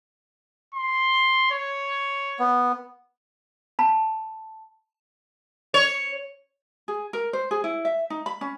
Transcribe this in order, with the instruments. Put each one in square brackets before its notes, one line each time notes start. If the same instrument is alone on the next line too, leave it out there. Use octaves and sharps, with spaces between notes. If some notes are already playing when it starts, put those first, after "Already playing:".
[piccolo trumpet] C6
C#5
[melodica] B3
[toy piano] A5 B5
[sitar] C#5
[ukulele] G#4
A#4
C5
G#4
E4
E5
D#4
B5
C#4